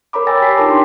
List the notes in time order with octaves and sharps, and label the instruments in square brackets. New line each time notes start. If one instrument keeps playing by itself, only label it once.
[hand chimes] A#4 C#5 A#5 B5 D6
C#5 G5 G#5 E6 A6 A#6
G4 G5 B6 C7
D#4 F4 A#4 A5 A#5 D6
D4 G5 C6